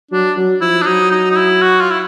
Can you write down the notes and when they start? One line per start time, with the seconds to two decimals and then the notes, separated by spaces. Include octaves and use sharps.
0.11 F#3 D4
0.36 F#3
0.61 F3 E4
0.82 D4
0.86 F#3 D#4
1.12 D#4
1.31 D#4
1.37 E4
1.62 F#4
1.81 F4
1.91 E4